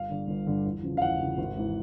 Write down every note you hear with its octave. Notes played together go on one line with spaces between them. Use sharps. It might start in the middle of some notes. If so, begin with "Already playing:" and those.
Already playing: G1 F5
G2 D3
G1
G2 D3
E2
C#3 F3
F5
E2 F#5
C#3 F3
G#1
G#2 E3